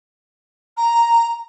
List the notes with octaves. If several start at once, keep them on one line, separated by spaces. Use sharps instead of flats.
A#5